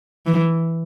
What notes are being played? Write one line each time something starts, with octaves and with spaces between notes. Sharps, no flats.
E3